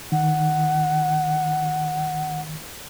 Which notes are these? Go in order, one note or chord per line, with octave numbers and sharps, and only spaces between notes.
D#3 F#5